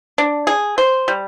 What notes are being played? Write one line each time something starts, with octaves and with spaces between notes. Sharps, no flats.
D4
G#4
C5
G3